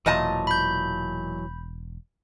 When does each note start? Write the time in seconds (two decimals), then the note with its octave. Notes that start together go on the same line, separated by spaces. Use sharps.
0.06 E1 A#2 E3 F#3 D#5 A5
0.47 B5 G6